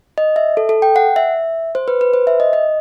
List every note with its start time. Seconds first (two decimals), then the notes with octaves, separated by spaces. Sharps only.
0.18 D#5
0.36 E5
0.57 A4
0.69 A4
0.82 G5
0.96 F#5
1.16 E5
1.75 C5
1.88 B4
2.01 B4
2.13 C5
2.27 E5
2.40 D#5
2.53 D#5